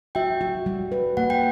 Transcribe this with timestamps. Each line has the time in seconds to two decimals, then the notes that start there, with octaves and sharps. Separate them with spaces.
0.15 F#4 E5 G5
0.41 F#4
0.66 G3
0.92 B4
1.17 A#3 F#5
1.30 G5